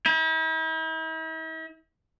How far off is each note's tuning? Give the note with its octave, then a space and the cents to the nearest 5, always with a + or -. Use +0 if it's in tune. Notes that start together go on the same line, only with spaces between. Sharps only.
E4 -45